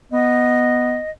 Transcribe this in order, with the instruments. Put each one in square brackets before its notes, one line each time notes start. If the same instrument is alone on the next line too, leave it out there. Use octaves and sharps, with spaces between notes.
[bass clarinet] B3 [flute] D#5